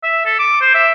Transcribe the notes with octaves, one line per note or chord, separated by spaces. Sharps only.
E5
A4
D6
C5
E5